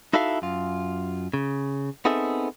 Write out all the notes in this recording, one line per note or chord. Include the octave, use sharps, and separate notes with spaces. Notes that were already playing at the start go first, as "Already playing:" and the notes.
D#4 E4 F#4 A4 E5 F5
F#2 F4
C#3
B3 C4 D#4 G#4 A4 E5